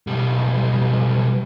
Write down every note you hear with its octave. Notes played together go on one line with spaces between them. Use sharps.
B1 G3